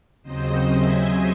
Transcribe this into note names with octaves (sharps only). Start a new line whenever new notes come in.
D#2 C#3 F#3 C4 C5 D#5
E5 G#5